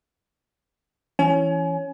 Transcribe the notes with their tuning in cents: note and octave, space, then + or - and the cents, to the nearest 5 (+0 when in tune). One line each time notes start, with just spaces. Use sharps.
E3 +10 C#4 +0 G#5 +30